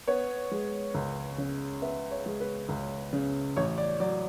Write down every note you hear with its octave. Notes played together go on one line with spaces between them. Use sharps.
B3 C#5
G#3
C#2
C#3
B3 E5
C#5
G#3
B4
C#2
C#3
A1 C#5
D5
F#3 D5